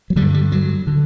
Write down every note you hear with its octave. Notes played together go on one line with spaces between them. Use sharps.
F#3
D3 G3
G2
G3
F#3
D3